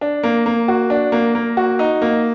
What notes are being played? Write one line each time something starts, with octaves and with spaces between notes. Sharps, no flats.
D4
A#3
A#3
F#4
D4
A#3
A#3
F#4
D#4
A#3